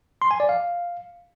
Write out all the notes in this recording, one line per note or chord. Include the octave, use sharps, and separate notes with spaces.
C6
G#5
D5
F5